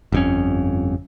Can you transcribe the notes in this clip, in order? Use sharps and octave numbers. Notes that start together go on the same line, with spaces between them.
G1 F2 C#4